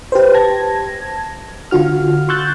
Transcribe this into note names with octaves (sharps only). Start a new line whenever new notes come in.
G4 B4 C5
A5 G#6 A#6
D3 F4 F#4 F6
C6 C#6 E6 F#6 G6 A6